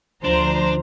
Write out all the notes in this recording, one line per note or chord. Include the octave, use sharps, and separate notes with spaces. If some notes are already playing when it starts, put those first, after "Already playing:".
D2 F3 D4 C5 A#5